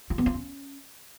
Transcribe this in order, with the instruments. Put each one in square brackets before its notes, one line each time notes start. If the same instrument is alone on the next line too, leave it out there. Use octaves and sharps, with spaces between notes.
[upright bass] F4
B3
F4
C#4